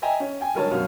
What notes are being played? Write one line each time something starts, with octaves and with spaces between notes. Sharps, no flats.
D#5 E5 G5 G#5 A#5
C#4
G5 G#5
G#1 D3 G3 A#4 C#5 A5
B1 F#2 C#4 F5 F6